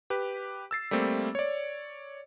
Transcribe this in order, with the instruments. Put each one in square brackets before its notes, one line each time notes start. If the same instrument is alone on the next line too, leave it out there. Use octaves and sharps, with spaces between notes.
[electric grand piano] G4 B4
E6 A6 C7
G3 A3 A#3 C4
C#5 D5